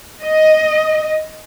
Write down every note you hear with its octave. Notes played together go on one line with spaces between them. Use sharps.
D#5